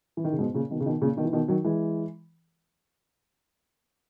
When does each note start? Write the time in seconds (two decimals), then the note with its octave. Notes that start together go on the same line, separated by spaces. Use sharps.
0.17 E3
0.25 D#3
0.32 C#3
0.39 G#2 B2
0.54 A#2 C#3
0.71 B2 D#3
0.80 C#3
0.86 B2 D#3
1.02 A#2 C#3
1.17 B2 D#3
1.25 E3
1.33 B2 D#3
1.48 D#3 F#3
1.64 E3 G#3